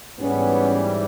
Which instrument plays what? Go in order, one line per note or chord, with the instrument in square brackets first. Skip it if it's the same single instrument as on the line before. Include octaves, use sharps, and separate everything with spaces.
[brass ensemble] G#2 E3 G3 B3 C#4